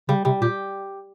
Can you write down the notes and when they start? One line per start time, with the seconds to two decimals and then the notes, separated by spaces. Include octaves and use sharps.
0.09 C#3 G3
0.25 C3 G3
0.42 A#2 G4